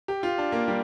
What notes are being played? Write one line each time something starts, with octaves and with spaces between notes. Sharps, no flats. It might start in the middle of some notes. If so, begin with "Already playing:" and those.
G4
F4
D4
A#3
G3